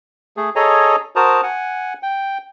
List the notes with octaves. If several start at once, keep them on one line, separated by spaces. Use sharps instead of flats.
A3 G#4
G#4 A4 C#5 D#5 G#5 A#5
F#4 A#4 C5 A5 A#5 D#6
F#5 G#5
G5